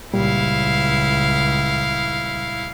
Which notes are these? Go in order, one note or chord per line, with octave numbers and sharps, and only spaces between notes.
C#2 A#2 G3 E4 F5